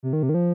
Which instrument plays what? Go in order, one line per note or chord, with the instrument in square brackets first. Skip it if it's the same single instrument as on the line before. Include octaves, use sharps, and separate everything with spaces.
[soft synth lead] C3
D#3
C3
D#3
F3